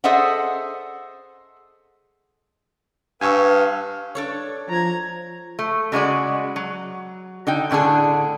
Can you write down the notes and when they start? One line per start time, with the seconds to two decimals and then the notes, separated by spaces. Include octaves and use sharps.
0.04 G#4 A4 C5 D#5 E5 F#5
3.21 G2 B4 F5 G#5 C#6 E6
4.15 D4 A4 C#5
4.69 F3 A#5 G#6
5.59 A3
5.92 C#3 G#3 F#4 D5
6.56 F#3
7.47 D3 D#4 G5
7.71 A2 D3 D4 G#4